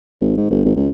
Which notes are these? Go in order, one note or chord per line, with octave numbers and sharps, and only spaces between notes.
G#1
G#2
G1
G#1
C#2